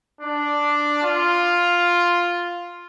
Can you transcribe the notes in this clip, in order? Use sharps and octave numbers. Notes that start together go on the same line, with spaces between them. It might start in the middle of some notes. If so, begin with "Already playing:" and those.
D4
F4